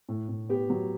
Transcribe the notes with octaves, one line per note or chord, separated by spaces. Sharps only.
A2
A2
B3 G4
F#3